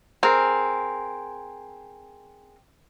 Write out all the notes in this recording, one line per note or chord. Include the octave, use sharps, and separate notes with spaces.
C4 G#4 A#4